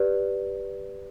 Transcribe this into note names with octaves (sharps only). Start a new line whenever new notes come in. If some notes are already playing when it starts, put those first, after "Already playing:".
Already playing: G4 B4 D5